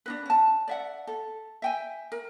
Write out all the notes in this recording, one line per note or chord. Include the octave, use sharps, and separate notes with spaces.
D4 D#4 B4
C#4 A5
D5 E5 F#5
A4
E5 G5 G#5
A#4